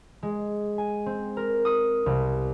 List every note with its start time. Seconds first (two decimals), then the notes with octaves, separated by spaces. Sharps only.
0.23 G#3
0.78 G#5
1.06 C4
1.37 A#4
1.65 D#6
2.06 C2